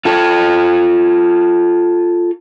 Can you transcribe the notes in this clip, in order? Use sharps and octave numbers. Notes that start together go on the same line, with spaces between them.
F4 A4